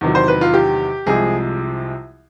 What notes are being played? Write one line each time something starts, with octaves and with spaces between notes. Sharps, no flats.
E2 C3 D#3 F#3
C5
B4
F4
G4
C2 C3 F3 G#3 G#4